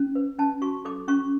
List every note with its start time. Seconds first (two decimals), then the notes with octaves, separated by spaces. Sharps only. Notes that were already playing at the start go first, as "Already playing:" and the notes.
Already playing: C#4
0.15 B4
0.39 C#4 A5
0.62 F#4 C#6
0.85 A4 D6
1.08 C#4 C#6